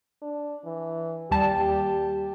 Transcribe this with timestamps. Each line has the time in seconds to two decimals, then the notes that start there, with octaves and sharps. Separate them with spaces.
0.22 D4
0.64 E3
1.31 D#2 G3 G4 A5